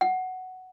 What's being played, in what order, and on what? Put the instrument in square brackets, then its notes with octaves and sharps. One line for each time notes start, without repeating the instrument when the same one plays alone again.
[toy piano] F#5